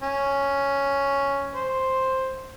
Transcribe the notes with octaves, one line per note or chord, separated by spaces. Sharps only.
C#4
C5